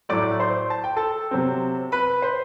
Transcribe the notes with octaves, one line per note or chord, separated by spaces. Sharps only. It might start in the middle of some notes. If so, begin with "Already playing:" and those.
A2 F#3 A3 D5 D6
C5 C6
A5
G5
A4 A5
C3 F#3 C4
B4 B5
C5 C6